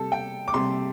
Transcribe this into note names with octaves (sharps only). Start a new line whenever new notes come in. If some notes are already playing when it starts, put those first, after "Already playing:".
Already playing: C3 G3 A4
G5
D6
C3 G3 C6